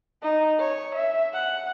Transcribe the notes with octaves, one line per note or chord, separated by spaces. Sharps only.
D#4
C#5
E5
F#5